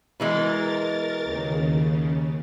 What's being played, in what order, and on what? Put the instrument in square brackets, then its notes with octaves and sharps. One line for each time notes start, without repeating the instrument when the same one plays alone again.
[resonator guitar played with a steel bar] B2 E3 G#3 [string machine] A#4 A6
[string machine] D#2 C#3